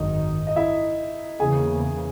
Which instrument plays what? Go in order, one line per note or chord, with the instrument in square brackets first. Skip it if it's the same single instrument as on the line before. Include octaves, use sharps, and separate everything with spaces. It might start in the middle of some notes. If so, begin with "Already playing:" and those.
Already playing: [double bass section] G#1 F#2 D#3 [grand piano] D#4 D#5
[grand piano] D#5
E4 E5
[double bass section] E2 C#3 E3 A#3 [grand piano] G#4 G#5